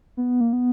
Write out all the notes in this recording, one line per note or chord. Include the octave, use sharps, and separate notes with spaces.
B3
A#3
B3